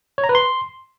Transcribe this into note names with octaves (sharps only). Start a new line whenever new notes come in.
C#5
A#5
B4
C6